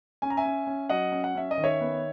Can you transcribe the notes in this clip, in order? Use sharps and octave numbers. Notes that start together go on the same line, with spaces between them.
C#4 G#5
A#5
E5 G#5
C#4
C#4
F#3 D#5 F#5
C#4
F#5
C#4 E5
D#5
D#3
C#5 E5
B3